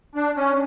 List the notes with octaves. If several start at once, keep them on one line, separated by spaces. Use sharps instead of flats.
D4
C#4